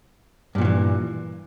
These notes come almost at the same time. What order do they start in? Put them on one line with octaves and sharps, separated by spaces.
G2 A#2 F#3 E3